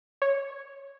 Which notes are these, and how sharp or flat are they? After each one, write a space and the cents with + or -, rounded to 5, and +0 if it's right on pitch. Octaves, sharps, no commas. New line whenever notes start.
C#5 -5